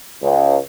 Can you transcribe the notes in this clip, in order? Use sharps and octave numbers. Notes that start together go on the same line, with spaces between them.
C#2